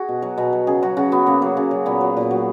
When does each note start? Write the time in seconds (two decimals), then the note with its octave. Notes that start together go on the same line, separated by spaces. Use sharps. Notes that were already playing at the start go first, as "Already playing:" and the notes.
Already playing: F#4 G#4
0.09 B2
0.22 F#3
0.38 B2
0.53 F#3
0.67 C#3 G#4
0.83 F#3 F#4
0.97 C#3 F#4
1.12 F#3 B3
1.26 C#3 A#3
1.42 F#3
1.57 C#3
1.71 F#3
1.86 A#2 B3
2.01 F#3
2.17 A#2
2.31 F#3